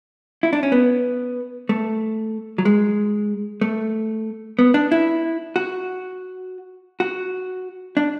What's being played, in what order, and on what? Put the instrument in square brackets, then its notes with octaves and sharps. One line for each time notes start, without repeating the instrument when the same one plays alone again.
[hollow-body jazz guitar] E4
D4
C#4
B3
A3
F#3
G#3
A3
B3
D4
E4
F#4
F#4
D4